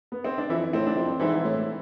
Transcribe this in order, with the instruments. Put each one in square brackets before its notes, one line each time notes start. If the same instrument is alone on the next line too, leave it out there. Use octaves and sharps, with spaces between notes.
[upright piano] B3
C4
D4
[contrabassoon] F2 [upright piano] E3 E4
[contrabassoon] A2 [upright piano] C4
[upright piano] D4
[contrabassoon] F2 [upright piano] C4
[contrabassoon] G#2 [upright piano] E3 E4
[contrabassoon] A2